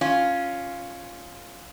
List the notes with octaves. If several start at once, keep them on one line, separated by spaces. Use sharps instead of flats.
C#4 F4